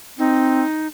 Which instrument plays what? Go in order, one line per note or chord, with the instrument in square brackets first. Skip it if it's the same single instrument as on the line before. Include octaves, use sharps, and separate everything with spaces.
[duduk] C4 [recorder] D#4